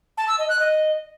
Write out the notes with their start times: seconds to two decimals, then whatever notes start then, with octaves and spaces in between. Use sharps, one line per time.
0.17 A5
0.28 E6
0.38 D#5
0.49 F#6
0.59 D#5